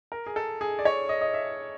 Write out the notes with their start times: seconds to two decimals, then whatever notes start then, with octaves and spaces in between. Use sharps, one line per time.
0.12 A#4
0.26 G#4
0.36 A4
0.61 G#4
0.79 D5
0.85 C#5
1.09 D#5
1.21 D#5
1.34 E5